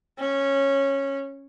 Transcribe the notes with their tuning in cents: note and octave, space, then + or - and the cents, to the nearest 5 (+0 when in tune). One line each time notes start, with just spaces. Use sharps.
C#4 -10